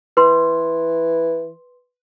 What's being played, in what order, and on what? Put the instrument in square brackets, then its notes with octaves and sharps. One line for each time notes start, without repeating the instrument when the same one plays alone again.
[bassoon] E3 [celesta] B4 C6